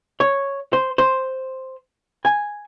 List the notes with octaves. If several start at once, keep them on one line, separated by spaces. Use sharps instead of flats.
C#5
C5
C5
G#5